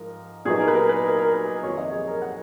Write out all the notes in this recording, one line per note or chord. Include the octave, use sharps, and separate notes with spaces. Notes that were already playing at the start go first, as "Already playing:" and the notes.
Already playing: G#2 F3 A#4
A#2 F#3 B3 D#4 G#4
A#4
B4
A#4
B4
A#4
A#4
B4
F2 D#3 F#3 C#5
D#5
G#4
A#4
F#5